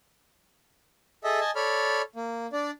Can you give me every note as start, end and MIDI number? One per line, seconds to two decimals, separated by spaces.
1.24 1.40 68
1.24 1.40 69
1.24 1.40 75
1.24 1.40 76
1.40 1.51 75
1.40 1.51 80
1.40 1.51 81
1.56 2.02 69
1.56 2.02 73
1.56 2.02 74
1.56 2.02 83
1.56 2.02 89
2.16 2.47 58
2.53 2.71 62
2.53 2.71 74